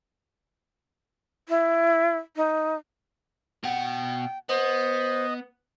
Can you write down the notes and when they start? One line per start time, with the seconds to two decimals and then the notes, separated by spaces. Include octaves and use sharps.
1.49 E4
2.36 D#4
3.64 B2 F#5 G5
4.49 B3 C5 D#5